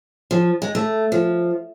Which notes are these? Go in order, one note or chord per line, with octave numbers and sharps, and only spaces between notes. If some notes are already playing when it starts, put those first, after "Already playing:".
F3
G#3
A3
F3